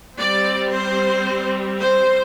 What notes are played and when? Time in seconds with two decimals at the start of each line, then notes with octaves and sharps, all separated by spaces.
0.18 G3 C4 D5
0.72 C5
1.81 C5